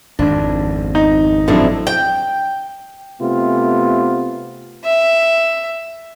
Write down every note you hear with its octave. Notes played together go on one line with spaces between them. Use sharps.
G#1 F2 D4
D#4
A2 F3 F#3 C4 D4 E4
G5
C3 A3 B3 F4
E5